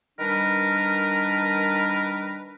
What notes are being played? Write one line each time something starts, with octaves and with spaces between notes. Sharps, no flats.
D#3 G3 D4 A#4 B4